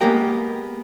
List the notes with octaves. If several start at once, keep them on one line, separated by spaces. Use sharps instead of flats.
G#3 A#3 B3 G4 A#4 G5